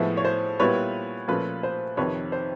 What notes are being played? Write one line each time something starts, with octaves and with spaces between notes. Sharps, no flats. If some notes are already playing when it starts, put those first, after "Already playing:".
Already playing: A2 F3 G#3 B3 E4
C#5
C5
A#2 G3 B3 E4 B4 C#5
A#2 F3 A3 C#4 F4 B4
C5
F2 C3 D#3 B4 C#5
C5